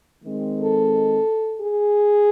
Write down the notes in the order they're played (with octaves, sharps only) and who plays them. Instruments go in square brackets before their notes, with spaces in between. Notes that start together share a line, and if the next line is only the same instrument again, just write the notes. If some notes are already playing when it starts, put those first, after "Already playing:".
[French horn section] D#3 G#3 C4
A4
G#4